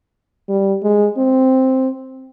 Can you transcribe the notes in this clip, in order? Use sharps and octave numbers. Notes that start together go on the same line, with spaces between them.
G3
G#3
C4